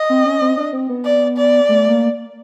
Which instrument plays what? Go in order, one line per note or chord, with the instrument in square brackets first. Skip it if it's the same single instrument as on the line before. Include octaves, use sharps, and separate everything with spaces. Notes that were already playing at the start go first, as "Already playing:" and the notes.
Already playing: [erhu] D#5
[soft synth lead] C4
C#4
C4
D4
C4
B3
[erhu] D5
D5
[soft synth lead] A3
A#3